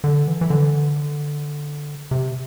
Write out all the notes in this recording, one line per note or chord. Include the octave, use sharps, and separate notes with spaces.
D3
E3
E3
D3
C3